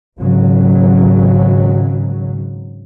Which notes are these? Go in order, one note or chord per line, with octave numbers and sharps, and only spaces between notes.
G#1 C#3 F#3